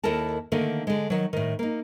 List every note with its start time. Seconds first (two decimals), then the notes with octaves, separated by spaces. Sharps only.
0.03 D#2 E4 A4 A#4 A5
0.52 D3 D#3 A3 A#3
0.87 D3 G#3
1.10 D#3 F#3
1.33 A2 D#3
1.59 A#3 D#4